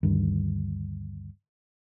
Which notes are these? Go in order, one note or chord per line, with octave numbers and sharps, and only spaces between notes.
D2 G2 D#3